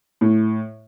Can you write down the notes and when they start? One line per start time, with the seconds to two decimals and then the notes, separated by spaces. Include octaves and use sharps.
0.21 A2